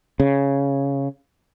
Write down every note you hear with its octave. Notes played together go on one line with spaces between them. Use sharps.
C#3